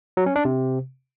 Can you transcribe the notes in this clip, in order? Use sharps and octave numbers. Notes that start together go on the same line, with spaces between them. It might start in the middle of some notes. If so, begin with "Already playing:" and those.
F#3
C#4
D4
C3